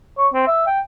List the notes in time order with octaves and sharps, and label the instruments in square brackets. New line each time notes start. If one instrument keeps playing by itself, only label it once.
[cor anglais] C#5
C4
E5
G5